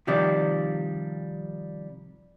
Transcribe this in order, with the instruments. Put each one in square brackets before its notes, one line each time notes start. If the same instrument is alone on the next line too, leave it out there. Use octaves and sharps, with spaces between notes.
[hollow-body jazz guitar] C3 D#3 F3 G3 D5